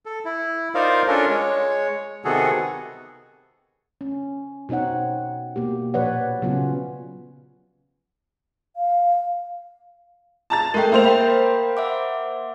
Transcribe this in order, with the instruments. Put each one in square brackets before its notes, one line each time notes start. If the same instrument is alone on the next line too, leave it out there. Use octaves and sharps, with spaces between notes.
[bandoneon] A4
E4
D#4 F4 A#4 C5 D5 F5
C#4 D4 F4 A4 A#4
G#3 C#5
C3 D#3 B3 F#4 G#4 A4
[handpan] C#4
B2 C4 D#4 C#5 F#5
B2 A#3 G4
A#2 F3 B4 C#5 D5 F#5
C#3 F#3 B3 C#4 F4
[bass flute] F5
[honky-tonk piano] A5 A#5 A6
[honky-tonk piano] G#3 A3 [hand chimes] A#4 G5
[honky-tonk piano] A#3 C5 F7 [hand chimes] E5
[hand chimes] A#4 G5 B5
E5 F#5 D6